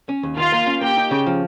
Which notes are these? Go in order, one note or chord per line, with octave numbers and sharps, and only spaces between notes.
C#4
D#2
D#3 F4 F5
A#3
C#4
A#3 G4 G5
D#4
C#3
F3